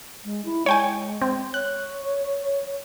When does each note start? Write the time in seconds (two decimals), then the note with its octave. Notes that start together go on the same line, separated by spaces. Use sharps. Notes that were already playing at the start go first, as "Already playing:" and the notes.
0.24 G#3
0.45 E4
0.66 G#3 C#5 G5 G#5
1.22 C4
1.54 C#5 F#6